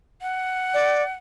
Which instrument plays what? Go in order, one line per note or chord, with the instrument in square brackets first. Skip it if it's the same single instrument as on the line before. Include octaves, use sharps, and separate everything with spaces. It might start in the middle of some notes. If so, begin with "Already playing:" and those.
[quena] F#5
[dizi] D5